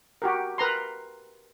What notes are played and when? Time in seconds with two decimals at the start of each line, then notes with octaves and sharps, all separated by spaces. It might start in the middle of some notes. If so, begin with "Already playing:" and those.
0.22 F#4 G4 A#4
0.58 A#4 B4 A#5 C6